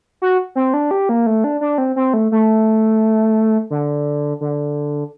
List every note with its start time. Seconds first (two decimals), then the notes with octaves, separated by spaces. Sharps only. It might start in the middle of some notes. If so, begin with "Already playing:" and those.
0.22 F#4
0.55 C4
0.74 D4
0.91 G4
1.09 A#3
1.26 A3
1.44 D4
1.61 D4
1.78 C4
1.96 C4
2.14 A3
2.32 A3
3.70 D3
4.41 D3